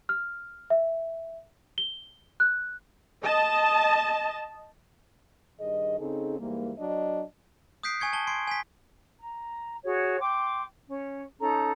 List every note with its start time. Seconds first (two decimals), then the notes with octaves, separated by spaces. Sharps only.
0.09 F6
0.70 E5
1.78 G7
2.40 F#6
3.24 D#5 A5
5.60 G2 D#3 G#4 D#5
5.99 C#3 C4 D#4 G#4 A4
6.39 G#2 E3 G3 A#3
6.79 F#3 D4 D#5
7.83 D#6 F#6 G6 B6 C7 D7
8.00 G#5 C#6 G#6 C#7
8.13 A5 G7
8.27 C6 G#6 C7 D7
8.47 G#5 B6
9.21 A#5
9.83 F#4 G#4 C#5
10.20 G5 C6 D6
10.88 C#4
11.39 C#4 D#4 A4 A#5